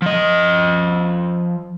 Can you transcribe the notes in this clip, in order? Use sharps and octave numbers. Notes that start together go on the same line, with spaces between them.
F3 D#5